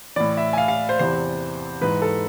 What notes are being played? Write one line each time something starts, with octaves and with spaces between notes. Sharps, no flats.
A2 E3 D5
E5
G#5
F5
F5
C5
E2 C3 E3 C5
G#2 E3 B4
A4